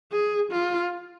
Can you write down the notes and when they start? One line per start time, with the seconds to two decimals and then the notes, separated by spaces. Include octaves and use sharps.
0.12 G#4
0.51 F4